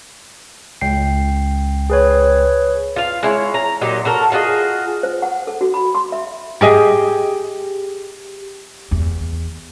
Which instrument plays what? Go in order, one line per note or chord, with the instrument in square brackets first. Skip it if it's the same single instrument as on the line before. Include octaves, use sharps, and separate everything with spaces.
[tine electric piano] C#2 G5 C7
[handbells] G#4 B4 C#5
[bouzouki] F4 F5
G#3 E4 C#5
A#5
A#2 F#3 D#4 G4
F#4 A4 A#4
F4 F#4 G#4 D#5
[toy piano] C5
F#5
A4
F#4
B5
C6
E5
[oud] G4 G#4 D#5
[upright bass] E2